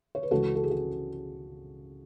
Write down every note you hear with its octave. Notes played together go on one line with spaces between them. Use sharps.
C#5
B4
C#2 C#3 E3 G#3 F#4 A4
A4
G#4
F#4